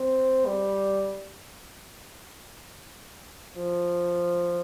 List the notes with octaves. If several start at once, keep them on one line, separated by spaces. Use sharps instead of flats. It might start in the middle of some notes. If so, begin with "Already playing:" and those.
Already playing: C4
G3
F3